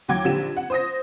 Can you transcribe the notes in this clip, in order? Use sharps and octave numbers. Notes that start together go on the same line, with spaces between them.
D#2 F#3 F#4 G5 D6 G#6
A#1 D3 G4 E7
F#5
C5 D#6 A#6